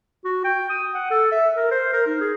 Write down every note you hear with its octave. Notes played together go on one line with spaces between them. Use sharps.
F#4
G5
D#6
F#5
A4
E5
A#4
C5
A#4
D#4
G#4